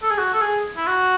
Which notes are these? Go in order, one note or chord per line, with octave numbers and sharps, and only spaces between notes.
A4
G#4
F#4
A4
G#4
E4
F#4